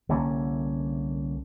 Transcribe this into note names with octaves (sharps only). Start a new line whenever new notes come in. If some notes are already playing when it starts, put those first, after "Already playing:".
C2 D3 A#3 C#4